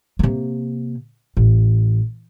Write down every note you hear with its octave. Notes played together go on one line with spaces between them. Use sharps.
C3 A#3
A1